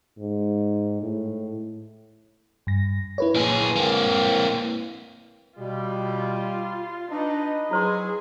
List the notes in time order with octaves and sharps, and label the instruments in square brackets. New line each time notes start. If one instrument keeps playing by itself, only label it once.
[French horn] G#2
A2
[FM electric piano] G2 A#6
E4 B4 C#5
[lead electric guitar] A#2 G#4
A#3 C4
[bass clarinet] B2 [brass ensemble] G3 [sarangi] F4
[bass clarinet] D4 [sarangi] D#4 [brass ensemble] B4 D#5
[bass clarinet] F#3 [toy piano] E4 C5 C6 [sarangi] G#4